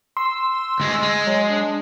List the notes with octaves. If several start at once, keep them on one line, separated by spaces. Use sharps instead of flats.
C6 E6
D2 G#3
G#3
F#3
D4